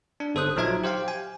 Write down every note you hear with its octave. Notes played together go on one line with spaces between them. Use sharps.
D4
G1 A4 C5 D#6 F#6
A#1 F3 F#3 D#4 E5 G#6
G4 C5 F5 G5
G#5